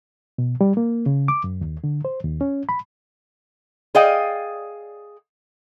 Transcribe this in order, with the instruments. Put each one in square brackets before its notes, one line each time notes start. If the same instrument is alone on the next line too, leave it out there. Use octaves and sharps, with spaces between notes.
[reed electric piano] B2
G3
A#3
C#3
D6
F#2
D#2
D3
C5
D#2
C#4
B5
[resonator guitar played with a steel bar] G#4 D5 D#5 F5 G5